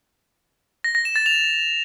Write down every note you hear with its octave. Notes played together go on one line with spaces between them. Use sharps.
A#6
A#6
E7
A6
F7